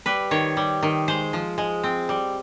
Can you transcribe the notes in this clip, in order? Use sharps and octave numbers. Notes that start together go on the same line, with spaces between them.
G3 B4
D#3 C#5
G3
D#3
G#3 C5
F3
G#3
C4
G3